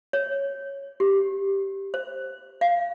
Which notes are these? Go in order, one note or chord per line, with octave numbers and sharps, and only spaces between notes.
C#5
G4
C5
F5